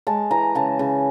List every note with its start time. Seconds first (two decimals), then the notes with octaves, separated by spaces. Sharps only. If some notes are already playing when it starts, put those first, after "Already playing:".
0.07 G#3 A5
0.31 E3 A#5
0.55 C#3 A5
0.79 C#3